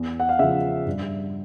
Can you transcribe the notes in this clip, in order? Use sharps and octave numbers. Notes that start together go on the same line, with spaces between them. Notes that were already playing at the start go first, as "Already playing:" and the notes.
Already playing: E2
F#5
F5
C#3 F3 E5
G2